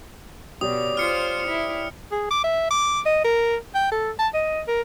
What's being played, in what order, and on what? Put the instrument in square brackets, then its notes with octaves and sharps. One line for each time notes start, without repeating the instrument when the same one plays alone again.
[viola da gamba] B2 [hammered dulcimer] G4 C#5 D5 [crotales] D#6
[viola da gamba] F4 C5 [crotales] F6 C#7
[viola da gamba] E4
[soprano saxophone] G#4
D6
E5
D6
D#5
A#4
G5
A4
A5
D#5
A#4